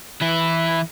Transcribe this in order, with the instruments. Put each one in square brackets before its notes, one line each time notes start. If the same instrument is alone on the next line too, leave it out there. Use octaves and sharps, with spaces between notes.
[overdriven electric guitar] E3 E4